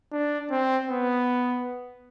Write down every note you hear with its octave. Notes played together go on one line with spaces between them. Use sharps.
D4
C4
B3